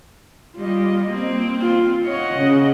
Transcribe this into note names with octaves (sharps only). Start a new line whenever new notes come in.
G3 F4 D#5
A#3 C4
F4
C#5 D#5 F#5
C#3